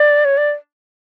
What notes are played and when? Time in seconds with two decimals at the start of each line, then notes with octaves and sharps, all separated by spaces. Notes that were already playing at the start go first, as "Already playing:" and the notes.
Already playing: D5
0.25 C#5
0.37 D5